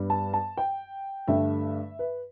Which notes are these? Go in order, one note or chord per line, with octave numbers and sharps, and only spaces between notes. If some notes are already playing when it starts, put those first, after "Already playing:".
Already playing: G2 G3 B3
A5
A5
G5
G2 D3 A3 E5
B4